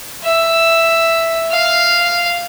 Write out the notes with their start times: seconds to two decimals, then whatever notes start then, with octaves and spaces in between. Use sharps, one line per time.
0.24 E5
1.51 F5